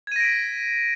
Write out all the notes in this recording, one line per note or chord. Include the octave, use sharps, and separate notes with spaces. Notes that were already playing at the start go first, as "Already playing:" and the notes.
G#6 A#6 B6 D7 D#7